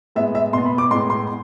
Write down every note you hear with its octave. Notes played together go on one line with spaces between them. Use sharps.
A2 G#3 B3 E5
E5
B2 B3 C6
B5
D6
A2 G#3 B3 C6
C6